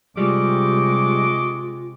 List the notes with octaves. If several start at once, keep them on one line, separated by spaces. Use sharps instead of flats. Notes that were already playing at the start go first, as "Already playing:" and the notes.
C3 G3 G#3 F4 D#5 C#6 D6